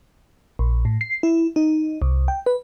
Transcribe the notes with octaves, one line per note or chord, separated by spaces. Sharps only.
A#1
A2
C7
E4
D#4
C2
G5
B4